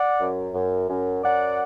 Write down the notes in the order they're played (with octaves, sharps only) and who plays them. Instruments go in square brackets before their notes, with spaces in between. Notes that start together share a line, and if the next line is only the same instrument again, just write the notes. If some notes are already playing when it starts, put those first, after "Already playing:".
Already playing: [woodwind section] D5 F#5
F#2
F#2
F#2
F#2 D5 F#5